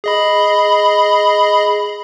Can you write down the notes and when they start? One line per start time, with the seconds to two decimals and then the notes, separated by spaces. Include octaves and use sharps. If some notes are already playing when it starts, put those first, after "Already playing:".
0.04 G#4 D#5 B5